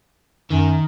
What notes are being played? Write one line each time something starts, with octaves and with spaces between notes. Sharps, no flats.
F#2 D#3